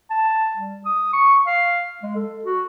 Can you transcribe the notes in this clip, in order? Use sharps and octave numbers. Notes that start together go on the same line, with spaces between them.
A5
G3
D#6
C#6
F5
G#3
A4
F#4